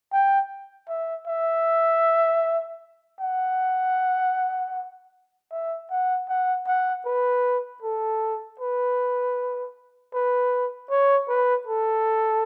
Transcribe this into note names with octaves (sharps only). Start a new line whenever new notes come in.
G5
E5
E5
F#5
E5
F#5
F#5
F#5
B4
A4
B4
B4
C#5
B4
A4